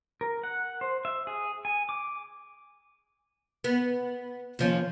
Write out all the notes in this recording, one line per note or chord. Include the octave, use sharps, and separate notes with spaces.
A#4
F#5
C5
E5
G#4
G#5
D6
B3
D#2 F3 C#4